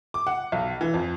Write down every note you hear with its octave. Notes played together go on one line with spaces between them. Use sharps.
D6
F#5
B1
E3
F2